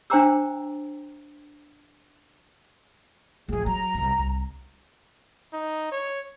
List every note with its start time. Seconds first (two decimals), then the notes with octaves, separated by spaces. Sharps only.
0.10 D4 C5 G5 A#5 D6 E6
3.49 A1 F3 G#4
3.66 F#3 A#5
3.94 D#1 C2
4.19 C2
5.53 D#4
5.92 C#5